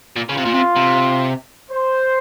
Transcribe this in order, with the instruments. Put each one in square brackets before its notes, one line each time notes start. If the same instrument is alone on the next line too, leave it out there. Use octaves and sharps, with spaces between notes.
[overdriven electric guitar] A#2
[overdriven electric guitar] C#3 [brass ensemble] F4
[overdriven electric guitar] C3
A#2
C3
C3
[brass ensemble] C5